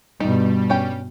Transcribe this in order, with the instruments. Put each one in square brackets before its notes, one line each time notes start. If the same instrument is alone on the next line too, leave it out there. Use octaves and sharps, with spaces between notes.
[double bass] G2 B2 [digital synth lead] G3 [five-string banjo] D#4
[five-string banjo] C#4 G4 G5